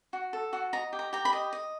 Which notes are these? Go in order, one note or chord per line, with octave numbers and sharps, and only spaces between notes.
F#4
A4
F#4
D#5 A#5
G4
A#5
G4 A#5
B5
D#5
D#5